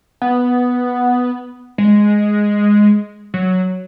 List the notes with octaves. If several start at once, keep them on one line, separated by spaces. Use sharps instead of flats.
B3
G#3
F#3